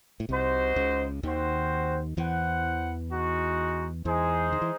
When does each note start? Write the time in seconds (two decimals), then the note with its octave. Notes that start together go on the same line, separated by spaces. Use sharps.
0.20 A2
0.29 C2 C3 D#4 F#4 C5
0.76 C#2 C#3
1.23 D#2 D#3 C4 F#4 C5 F#5
2.17 E2 E3 E4 C5 F#5
3.11 G#3 D#4 F#4
4.05 E2 E3 G#3 D#4 G#4 C5
4.52 D#3
4.61 E3